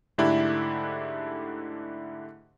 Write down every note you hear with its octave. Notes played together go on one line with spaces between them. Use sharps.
G#2 D3 A3 D4 E4 G4